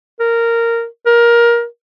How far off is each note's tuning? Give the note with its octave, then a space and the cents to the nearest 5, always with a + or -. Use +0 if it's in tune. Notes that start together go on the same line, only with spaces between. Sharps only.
A#4 -10
A#4 +20